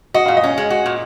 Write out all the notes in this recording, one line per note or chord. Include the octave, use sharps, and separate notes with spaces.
F#4 D#5
A#2 F5
D#5
C#4
G#3
F#4
A#2